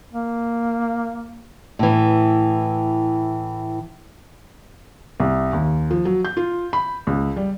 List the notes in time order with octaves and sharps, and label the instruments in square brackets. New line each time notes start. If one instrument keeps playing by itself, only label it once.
[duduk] A#3
[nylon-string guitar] A2 E3
[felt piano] C2
D#2
F3
F#3
G6
F4
B5
C#2
G3